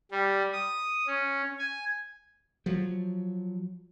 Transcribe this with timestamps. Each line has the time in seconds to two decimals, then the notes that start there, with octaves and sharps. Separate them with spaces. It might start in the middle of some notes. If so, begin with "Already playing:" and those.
0.11 G3
0.52 D#6
1.07 C#4
1.59 G#5
2.66 F3 F#3